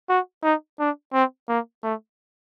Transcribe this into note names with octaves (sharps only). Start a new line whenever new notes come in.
F#4
D#4
D4
C4
A#3
A3